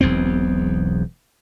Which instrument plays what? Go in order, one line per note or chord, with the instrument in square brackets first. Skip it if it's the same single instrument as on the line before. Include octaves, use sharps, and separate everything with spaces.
[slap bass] E1 B1 E2 C4